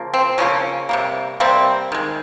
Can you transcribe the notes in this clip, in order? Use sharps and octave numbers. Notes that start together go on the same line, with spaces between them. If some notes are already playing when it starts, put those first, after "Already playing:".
Already playing: C#3 F3 A#3
C4
C#3 F3 A#3 C#4
C3 G3 A#3
C3 G3 A#3 C4
D#3 G#3